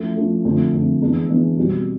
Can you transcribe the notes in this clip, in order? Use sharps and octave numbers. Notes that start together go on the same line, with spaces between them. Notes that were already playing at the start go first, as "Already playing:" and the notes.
Already playing: F3 A3 C#4 E4
F3 A3 C#4 E4
D3 F3 A3 C4
D3 F3 A3 C4
E3 G#3 B3 D4
E3 G#3 B3 D4
B2 G3 C4